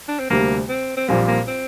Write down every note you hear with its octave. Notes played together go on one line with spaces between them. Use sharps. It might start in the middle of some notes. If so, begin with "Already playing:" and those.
D4
C4
D2 C3 G3 A#3
C4
C4
A#1 A#2 G3 A#3 C4
A#3
C4